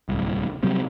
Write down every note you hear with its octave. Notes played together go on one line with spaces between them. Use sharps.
D1 C2
C3 F#3 G3 C4